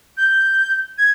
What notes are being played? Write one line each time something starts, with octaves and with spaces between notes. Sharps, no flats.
G6
G#6